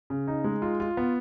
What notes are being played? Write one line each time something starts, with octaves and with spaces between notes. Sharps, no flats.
C#3
D#4
G#3
F4
F4
B3